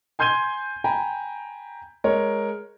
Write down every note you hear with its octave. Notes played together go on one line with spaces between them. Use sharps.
G#5 C6 G6 G#6 D#7 G7
G5 G#5 A#5 B5
G#3 A#4 C#5